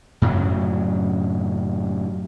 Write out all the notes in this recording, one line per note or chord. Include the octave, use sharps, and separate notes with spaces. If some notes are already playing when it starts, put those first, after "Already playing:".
F#2 A2 C#3 F#3